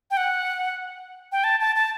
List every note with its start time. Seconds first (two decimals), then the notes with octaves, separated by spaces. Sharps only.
0.11 G5
0.17 F#5
1.32 G5
1.44 A5
1.60 A5
1.75 A5